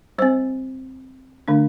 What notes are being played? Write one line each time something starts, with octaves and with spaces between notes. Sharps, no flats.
G3 C4 C5
D3 A3 D4